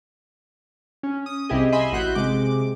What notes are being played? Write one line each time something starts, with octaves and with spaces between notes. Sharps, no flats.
C#4
D#6
C2 C3 E4 G4 G#4 D#5
D#5 E5 G#5 B5 C6
A1 F#4 F#6 G6
C3 G#3 D6